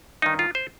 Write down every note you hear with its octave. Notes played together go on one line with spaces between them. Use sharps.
G2 D#3 D#4
F4
C5